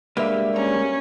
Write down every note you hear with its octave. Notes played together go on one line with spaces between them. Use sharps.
G3 G#3 A#3 D4 G4 B4 E5
C#4 A#5